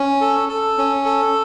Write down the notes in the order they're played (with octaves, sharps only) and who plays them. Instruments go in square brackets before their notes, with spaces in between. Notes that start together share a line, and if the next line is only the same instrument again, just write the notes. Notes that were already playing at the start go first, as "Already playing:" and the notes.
Already playing: [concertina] C#4
A4
A4
C#4
A4